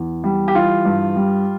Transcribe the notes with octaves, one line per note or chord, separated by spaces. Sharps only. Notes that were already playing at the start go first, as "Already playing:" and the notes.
Already playing: E2
G3
G4
E3 F4
G2
G3